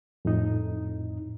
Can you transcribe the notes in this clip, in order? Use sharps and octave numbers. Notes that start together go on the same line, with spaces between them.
F2 A2 D#4